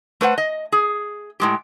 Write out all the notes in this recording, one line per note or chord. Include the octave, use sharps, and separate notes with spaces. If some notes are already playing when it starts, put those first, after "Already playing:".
A3 B4 C5 F#5
D#5
G#4
A2 G#3 G4